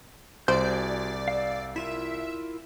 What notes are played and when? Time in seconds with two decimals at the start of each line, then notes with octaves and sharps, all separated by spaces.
0.48 C2 F#4 G#4 C5 D5 G6
1.28 F5 E6
1.76 E4 F4 A#4 E5